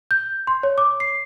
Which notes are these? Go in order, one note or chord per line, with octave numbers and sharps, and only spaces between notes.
G6
C6
C#5
D6
C7